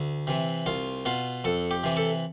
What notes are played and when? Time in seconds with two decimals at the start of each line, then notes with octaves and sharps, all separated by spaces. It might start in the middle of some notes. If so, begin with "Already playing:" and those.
Already playing: D2
0.27 C3 E3
0.66 C2 F4
1.05 B2 F4
1.44 F2 A4
1.71 G4
1.83 C3 E3
1.97 A4